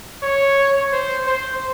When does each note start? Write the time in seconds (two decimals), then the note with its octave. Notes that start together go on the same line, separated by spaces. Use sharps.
0.22 C#5
0.92 C5
1.27 C5